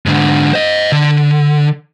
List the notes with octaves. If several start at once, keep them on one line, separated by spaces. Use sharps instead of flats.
G#2 D3
C5 D#5
D3